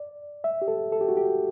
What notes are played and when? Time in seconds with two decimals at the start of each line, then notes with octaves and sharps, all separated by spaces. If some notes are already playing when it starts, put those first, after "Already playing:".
Already playing: D5
0.44 E5
0.62 G4
0.68 A4
0.92 A4
1.01 G4
1.09 F#4
1.17 G4